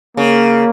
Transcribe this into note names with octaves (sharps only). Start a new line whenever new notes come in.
C#3 A#3